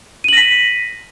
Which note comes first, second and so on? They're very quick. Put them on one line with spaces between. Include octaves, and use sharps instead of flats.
D#7 F#7 A#6 B6